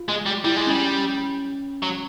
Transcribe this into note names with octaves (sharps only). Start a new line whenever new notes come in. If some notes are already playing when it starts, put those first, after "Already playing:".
Already playing: F4
G#3
G3
G3 E4
G#3
G3 C#4
C#4
F#3